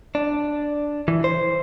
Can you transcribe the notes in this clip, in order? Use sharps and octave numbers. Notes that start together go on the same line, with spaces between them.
D4
E3
C5